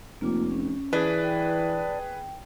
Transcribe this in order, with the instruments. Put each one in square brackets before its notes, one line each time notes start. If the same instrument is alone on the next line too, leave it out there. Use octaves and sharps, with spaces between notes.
[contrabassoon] F1 [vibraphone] A#3 F4 D6
[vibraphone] C#4
[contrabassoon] E3 [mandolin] D4 [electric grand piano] G#4 B4
[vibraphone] G5